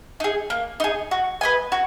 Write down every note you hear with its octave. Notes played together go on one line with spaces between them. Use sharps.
D#4 G#4
A#3
D#4 G#4
F#4
B4 D#5 G#5
F#4